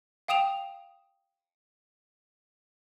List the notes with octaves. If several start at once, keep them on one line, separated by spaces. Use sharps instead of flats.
F5 G5 D#6 E7 F7